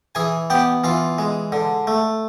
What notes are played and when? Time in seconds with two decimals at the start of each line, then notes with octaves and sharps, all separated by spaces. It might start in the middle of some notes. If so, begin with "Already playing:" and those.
0.15 E3 G#4 G#5
0.50 B3 G4 G5
0.84 E3 F4 F5
1.18 G#3
1.52 D3
1.87 A3